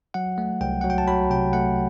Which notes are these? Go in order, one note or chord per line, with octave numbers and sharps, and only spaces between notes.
F#3 F#5
A3
C2 G5
F#3 F#5
G5
A5
F#3 B5
C3 G5
A3 F#5